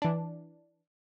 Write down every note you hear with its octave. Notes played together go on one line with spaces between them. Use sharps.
E3 D4